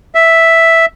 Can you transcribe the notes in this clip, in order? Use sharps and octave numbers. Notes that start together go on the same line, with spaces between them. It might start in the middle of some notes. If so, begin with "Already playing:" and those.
E5